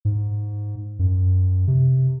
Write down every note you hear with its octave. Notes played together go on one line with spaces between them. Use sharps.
G#2
F#2
C3